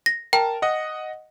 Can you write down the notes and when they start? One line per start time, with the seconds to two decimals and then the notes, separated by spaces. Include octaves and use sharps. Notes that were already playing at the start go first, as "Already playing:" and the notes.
0.06 A#6
0.33 A#4 G5 A5
0.62 D#5 F#5